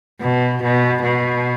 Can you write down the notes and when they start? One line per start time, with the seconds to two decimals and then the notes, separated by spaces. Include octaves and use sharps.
0.21 B2
0.62 B2
1.02 B2